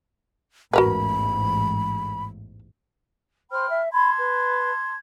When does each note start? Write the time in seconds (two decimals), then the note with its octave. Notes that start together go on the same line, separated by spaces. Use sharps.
0.73 A1 E2 G#2 F#4 A#4 B4 B5
3.51 C5 G5 B5 F6
3.69 E5
3.92 A5 B5 C6 G#6
4.18 B4